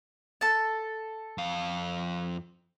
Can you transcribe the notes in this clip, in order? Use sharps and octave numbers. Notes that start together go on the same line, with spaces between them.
A4 A5
F2 F5